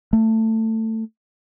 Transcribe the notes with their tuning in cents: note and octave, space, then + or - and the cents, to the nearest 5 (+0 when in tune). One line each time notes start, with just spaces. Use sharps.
A3 +20